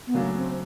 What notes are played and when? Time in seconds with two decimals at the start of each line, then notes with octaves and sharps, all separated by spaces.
0.07 B3
0.14 C#3 F#3 A3 A#3 D4
0.36 C4